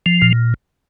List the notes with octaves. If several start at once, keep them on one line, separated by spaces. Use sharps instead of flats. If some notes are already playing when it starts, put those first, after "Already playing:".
F3
A#2